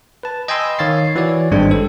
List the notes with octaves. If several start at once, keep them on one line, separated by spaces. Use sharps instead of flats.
B4 A5
D#5 G5 G#5 B5 C6 E6
D#3 C#5 F5 A6 C7
E3 F#4 C#5 D5
G#1 G2 G#3 D4 C5 G5
A4